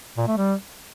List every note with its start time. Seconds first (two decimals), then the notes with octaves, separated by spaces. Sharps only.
0.18 A#2
0.27 A3
0.37 G3